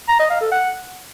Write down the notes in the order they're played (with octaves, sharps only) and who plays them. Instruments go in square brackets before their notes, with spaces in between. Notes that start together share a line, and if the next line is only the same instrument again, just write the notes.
[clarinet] A#5
D#5
F5
A4
F#5